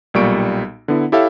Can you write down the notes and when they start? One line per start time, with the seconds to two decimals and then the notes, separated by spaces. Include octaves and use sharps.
0.14 B1 A#2 G3 C#6 D7
0.88 D3 B3 E4
1.12 E4 G4 A4 C#5 E5 F5